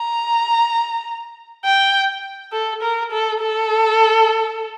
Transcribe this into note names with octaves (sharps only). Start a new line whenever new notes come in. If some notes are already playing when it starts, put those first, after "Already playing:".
Already playing: A#5
G5
A4
A#4
A4
A4